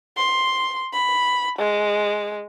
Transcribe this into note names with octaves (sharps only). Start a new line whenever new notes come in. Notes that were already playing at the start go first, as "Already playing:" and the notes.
C6
B5
G#3